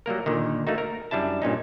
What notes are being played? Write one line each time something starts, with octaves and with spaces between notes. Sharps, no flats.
F#3 G3 A#3 A#4
A#2 D3 D#3
A3 A#3 D#4 F#4
A#4
F#2 G3 D4 E4 A5
G2 A#2 C#4 D#4